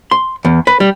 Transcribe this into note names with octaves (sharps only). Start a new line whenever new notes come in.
C6
E2
B4
G3